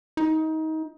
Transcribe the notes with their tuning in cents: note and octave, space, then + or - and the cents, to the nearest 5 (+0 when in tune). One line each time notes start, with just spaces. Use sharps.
D#4 +25